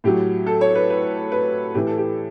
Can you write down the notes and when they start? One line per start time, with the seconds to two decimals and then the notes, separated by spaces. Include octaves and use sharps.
0.04 A2 F#3 G4
0.47 A4
0.61 C#5
0.75 B4
0.90 B4
1.32 B4
1.74 A2 E3 G4
1.87 A4
1.98 G4